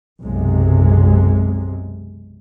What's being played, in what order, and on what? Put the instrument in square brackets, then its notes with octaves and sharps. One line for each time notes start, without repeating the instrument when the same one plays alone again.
[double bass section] B1 F#2 C3 G#3